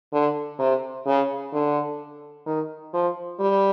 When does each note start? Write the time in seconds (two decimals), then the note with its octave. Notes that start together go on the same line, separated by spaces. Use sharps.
0.13 D3
0.59 C3
1.06 C#3
1.53 D3
2.46 D#3
2.93 F3
3.40 G3